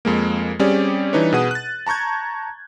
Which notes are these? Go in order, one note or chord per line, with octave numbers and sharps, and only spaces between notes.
F2 G#3 A#3
G3 C4 C#4 G4 G#4 D5
E3 G3 D4 D#4 B4 C#5
B2 G#4 B4 F#5 D#6 D#7
F#6 A6
A5 A#5 C#6 G6 G#6